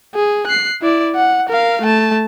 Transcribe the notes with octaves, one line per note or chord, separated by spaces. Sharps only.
G#4
F#6 C7
E4 D5
F#5
A#4 F5
A3 A5